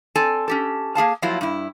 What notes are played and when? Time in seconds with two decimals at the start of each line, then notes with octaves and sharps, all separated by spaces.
0.16 C4 A4 D5 G#5
0.48 C#4 G4 A4
0.95 A#3 G#4 F5 A5
1.22 F3 F#3 A#3 E4 F4
1.41 G2 E4